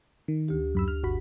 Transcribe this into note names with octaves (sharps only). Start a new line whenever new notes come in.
D#3
D2 G4
F#2 B5 E6
F6
G1 F#4 B5